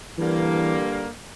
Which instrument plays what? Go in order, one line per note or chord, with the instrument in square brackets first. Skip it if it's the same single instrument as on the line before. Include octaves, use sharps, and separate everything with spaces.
[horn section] G2 D3 G3 A#3 [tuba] E3